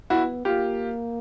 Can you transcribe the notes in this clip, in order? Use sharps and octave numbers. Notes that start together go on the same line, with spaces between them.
B3 E4 F#4
A#3 F4 G4